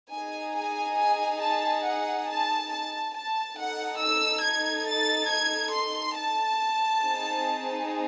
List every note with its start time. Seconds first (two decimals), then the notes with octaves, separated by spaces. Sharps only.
0.12 D#4 G#4 G#5
0.56 G#5
0.98 G#5
1.41 A5
1.85 F#5
2.29 A5
2.72 A5
3.14 A5
3.56 D#4 A4 F#5
4.01 E6
4.43 G#6
4.87 A6
5.29 G#6
5.73 C6
6.15 A5
7.01 C4 D#4 G#4